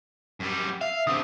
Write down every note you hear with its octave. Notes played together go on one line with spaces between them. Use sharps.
F#2 G3
E5 F5
D3 C4 D#6